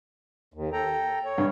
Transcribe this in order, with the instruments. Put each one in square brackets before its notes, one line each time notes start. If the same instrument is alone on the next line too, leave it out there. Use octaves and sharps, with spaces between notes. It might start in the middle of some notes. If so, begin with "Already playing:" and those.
[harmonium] D#2
A4 G5 A#5
C#5
[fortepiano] G2